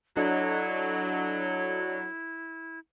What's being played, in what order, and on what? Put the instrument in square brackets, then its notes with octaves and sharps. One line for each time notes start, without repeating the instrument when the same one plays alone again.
[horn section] F#3 [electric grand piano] D4 A4 D#5 [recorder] E4